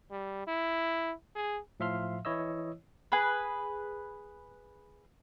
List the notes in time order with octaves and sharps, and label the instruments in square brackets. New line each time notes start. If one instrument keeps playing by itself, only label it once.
[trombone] G3
E4
G#4
[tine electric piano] A2 F3 E5 F5 C6 F6
E3 E4 C#5 D#5 E6
[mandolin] G#4 B4